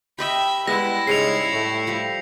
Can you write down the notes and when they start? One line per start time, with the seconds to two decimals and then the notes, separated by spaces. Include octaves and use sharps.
0.19 G4 D#5 E5 G5 B5
0.67 G3 G#3 B3 E4 A#6
1.07 G#2 C#3 G#3 C7 C#7 F7
1.53 A2 G3 A3
1.87 F3 G3 G4